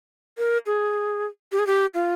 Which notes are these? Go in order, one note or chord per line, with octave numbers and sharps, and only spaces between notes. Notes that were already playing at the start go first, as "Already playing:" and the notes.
A#4
G#4
G4
G#4
G4
F4